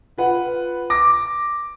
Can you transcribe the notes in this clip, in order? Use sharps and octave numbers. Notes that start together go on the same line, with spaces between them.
F4 B4 F#5
D6 A#6